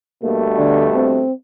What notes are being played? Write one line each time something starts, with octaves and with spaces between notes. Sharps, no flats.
G2 B2 A3 A#3
D3
C4